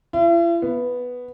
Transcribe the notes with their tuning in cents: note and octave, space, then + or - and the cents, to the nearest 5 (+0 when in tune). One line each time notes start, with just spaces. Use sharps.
E4 +45
B3 +0